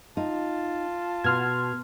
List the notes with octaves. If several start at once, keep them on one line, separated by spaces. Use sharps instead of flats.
D#4 F4 A5
B2 C6 F6 G#6